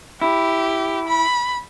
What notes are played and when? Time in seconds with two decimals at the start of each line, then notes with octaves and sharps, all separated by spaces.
0.22 E4 G4
1.08 B5